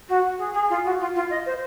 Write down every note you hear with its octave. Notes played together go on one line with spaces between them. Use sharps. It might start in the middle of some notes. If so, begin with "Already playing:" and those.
F#4
G#4
G#4
F4
F#4
F4
F4
D#5
C5